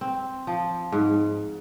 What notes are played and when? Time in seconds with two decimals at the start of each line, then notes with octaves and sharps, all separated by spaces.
0.01 C4
0.47 F3
0.92 G#2